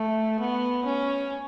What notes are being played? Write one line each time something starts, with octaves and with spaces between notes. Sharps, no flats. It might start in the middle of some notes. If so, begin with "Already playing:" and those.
Already playing: A3
B3
C#4